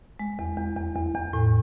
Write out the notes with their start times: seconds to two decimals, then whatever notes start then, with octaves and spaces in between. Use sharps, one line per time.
0.19 G#3
0.39 E2
0.58 E2
0.77 E2
0.96 E2
1.15 E2
1.33 A2